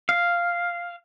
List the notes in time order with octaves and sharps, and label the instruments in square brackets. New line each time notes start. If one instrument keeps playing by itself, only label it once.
[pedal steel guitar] F5